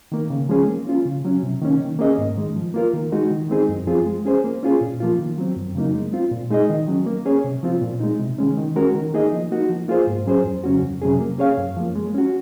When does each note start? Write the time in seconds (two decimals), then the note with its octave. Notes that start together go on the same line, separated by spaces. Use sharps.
0.12 D#3 A#3
0.30 C#3
0.49 F3 G#3 C#4 G#4
0.68 A#3
0.87 C#4 F4
1.05 C#3
1.25 F#3 C#4
1.43 C3
1.62 D#3 A#3 C#4
1.81 D#3
1.99 A#3 C#4 G#4 D#5
2.18 G#2
2.37 D#3 G#3
2.56 F3
2.74 A#3 F4 A#4
2.93 D#3
3.12 G#3 D#4 F#4
3.31 D#3
3.50 G#3 C4 D#4 G#4
3.69 F#2
3.87 F3 C4 F4 G#4
4.06 G#3
4.26 C#4 G#4 C5
4.44 A#3
4.63 C#4 F4 G#4
4.81 A#2
5.00 F3 A#3 F4
5.19 D#3
5.38 F#3 C4
5.56 F#2
5.75 C#3 F#3 A#3 D#4
5.95 G#3
6.13 C4 F4
6.32 A#2
6.50 G#3 D#4 G#4 D#5
6.69 D#3
6.88 F#3 C#4
7.06 A#3
7.26 C#4 G#4 C#5
7.44 C3
7.63 F3 C4 F4
7.82 A#2
8.00 G#3 D#4
8.20 C3
8.39 D#3 G#3 C#4
8.57 D#3
8.76 G#3 C#4 F#4 A#4
8.94 D#3
9.14 A#3 D#4 G#4 D#5
9.33 F3
9.52 A#3 D#4 F#4
9.69 F3
9.88 A#3 F4 G#4 C5
10.07 G#2
10.27 F#3 C#4 G#4 C5
10.44 F2
10.64 C#3 F#3 C#4 F#4
10.83 F2
11.02 C3 F#3 C#4 G#4
11.20 A#3
11.39 C#4 G#4 C#5 F5
11.58 F#2
11.77 F3 A#3
11.95 G#3
12.14 C#4 F#4